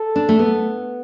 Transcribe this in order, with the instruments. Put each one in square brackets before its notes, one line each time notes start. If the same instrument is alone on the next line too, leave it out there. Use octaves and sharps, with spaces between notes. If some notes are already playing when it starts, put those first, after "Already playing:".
Already playing: [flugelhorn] A4
[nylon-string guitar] D4
A3
B3